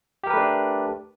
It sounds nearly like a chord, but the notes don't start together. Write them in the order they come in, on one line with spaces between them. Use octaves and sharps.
G4 A#4 B4 A3 D4